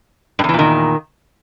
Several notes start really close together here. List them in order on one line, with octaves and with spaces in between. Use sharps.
G2 E2 E3 A#2 D#3